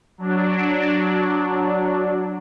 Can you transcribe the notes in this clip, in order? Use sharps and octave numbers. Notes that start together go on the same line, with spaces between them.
F#3 D4